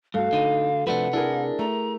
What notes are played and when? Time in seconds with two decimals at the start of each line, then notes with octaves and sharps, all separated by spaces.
0.14 G2 A3 F#4 F5
0.33 D3 D#4 D#7
0.87 C3 F3 A3 D4 B4 F#5
1.13 D4 E4 G#4 A#4
1.59 A3 A#5